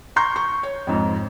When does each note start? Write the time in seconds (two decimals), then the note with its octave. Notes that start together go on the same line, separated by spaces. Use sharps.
0.16 A#5 C6 C#6 G6
0.36 C#6
0.63 C#5
0.87 F2 G#2